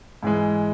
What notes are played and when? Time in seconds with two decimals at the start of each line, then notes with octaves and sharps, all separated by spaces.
0.23 G#2 E3 G#3